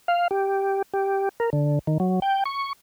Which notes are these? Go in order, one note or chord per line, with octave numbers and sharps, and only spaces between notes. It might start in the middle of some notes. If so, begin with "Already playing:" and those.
F5
G4
G4
A#4
D3
D#3
F#3
G5
C#6